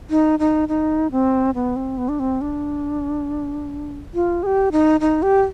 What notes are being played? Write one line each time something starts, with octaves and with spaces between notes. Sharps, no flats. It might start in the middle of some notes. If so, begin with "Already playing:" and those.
D#4
D#4
D#4
C4
B3
C4
B3
D4
C4
D4
F4
G#4
G4
D#4
D#4
G4